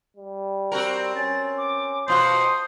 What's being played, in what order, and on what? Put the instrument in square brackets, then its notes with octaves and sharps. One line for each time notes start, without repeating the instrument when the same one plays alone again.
[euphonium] G3
[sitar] C4 F#4 A#4
[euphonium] C#4 [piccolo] A6
[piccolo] D6
[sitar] B2 F4 F#4 [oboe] C5 [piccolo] D#6